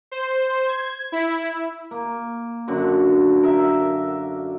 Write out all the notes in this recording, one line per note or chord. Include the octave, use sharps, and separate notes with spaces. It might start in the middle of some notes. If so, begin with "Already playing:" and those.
C5
G#6
E4
A#3
F#2 D3 D4 F#4
A#4 E5